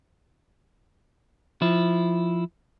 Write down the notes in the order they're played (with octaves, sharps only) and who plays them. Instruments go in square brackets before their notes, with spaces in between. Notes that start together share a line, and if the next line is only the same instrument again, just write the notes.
[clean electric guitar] F3 E4